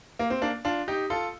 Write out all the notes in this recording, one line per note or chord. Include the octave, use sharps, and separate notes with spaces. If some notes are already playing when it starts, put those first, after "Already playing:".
A#3
C4
A#3 D4
D4 F4
D#4 G4
F4 A4